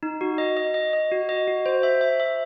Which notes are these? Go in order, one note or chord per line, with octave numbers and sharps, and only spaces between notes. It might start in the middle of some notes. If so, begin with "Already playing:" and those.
D#4
F#4
D#5
D#5
D#5
D#5
F#4
D#5
F#4
C5
E5
E5
E5